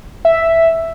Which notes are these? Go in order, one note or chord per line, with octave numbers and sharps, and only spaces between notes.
E5